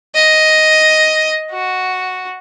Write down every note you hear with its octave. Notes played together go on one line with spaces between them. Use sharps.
D#5
F#4